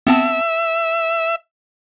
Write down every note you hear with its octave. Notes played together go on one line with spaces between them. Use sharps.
B3 C4 E5 A5